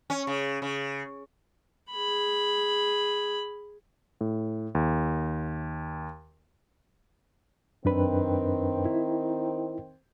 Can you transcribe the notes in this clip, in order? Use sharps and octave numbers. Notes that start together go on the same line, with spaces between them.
C#4
C#3
C#3
G#4 B5
A2
D#2
F#2 D#3 C4 D4 B4
E4